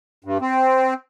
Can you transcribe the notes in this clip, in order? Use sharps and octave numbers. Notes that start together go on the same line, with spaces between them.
G2
C4